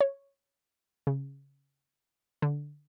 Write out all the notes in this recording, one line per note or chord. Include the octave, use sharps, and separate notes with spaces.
C#5
C#3
D3